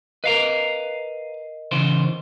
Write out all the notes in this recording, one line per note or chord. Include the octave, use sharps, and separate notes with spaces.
A#4 B4 D#5 F5 A#5
C#3 E3 C5